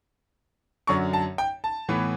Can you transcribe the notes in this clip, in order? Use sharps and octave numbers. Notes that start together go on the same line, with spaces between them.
F#2 D3 F#3 C#6
A5
G5
A5
A2 E3 B3